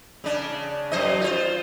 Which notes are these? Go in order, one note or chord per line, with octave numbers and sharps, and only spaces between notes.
C#3 D4
F#2 C5 D#5
F4 C5